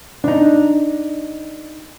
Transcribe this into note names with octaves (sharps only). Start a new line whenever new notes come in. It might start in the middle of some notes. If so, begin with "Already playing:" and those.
D4 D#4